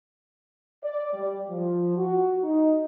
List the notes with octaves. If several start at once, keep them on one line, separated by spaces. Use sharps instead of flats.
D5
G3
F3
F#4
D#4